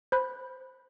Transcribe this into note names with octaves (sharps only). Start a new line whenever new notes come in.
C5 B5 F#6